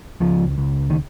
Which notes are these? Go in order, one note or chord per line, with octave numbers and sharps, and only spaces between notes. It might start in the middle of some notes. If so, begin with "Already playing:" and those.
C#2 F3
C#2
D#3